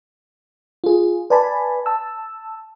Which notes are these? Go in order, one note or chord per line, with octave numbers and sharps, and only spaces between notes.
F4 G#4
B4 D5 G#5 A5 B5
A5 E6